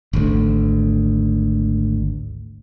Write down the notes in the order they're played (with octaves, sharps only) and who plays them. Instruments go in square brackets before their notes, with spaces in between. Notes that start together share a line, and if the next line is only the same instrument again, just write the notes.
[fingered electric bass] G#1 D2